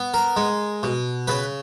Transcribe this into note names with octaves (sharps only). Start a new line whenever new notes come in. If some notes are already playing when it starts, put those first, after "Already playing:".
Already playing: B3
A#4
G#3
B2
C#3 B4